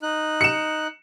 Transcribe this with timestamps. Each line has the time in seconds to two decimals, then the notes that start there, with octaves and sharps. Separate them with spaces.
0.03 D#4 F#6
0.41 C#7 E7